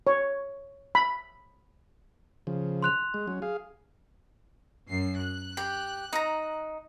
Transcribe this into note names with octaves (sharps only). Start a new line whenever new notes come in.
C#5
B5
C#3 F3
C6 F#6 F7
G#3
F#3 C#4
G#4 F5
F#2 C7
F#6
G4
D#4 A#5